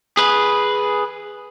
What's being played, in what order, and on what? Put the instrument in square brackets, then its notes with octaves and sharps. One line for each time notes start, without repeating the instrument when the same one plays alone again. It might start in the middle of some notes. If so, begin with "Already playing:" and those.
[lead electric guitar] G#4 B4